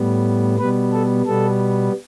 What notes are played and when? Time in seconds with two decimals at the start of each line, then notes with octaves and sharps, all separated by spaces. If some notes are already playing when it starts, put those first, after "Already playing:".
Already playing: A2 G3 B3
0.58 B2 G3 B3 B4
0.92 A4
1.26 B2 G3 B3 A4